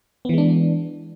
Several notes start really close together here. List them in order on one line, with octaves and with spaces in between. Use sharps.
B3 E3 G#3 D4